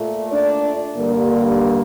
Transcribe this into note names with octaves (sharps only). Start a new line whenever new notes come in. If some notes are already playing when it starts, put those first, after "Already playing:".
Already playing: A#2 A3
D4 D5
G2 D3 G3 A#3